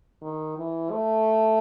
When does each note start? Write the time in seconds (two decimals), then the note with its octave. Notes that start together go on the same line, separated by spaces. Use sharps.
0.22 D#3
0.57 E3
0.91 A3